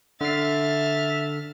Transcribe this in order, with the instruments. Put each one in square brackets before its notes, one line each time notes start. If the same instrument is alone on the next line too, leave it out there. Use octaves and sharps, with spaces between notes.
[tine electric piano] D3 C7 [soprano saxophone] E5 [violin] F6 A6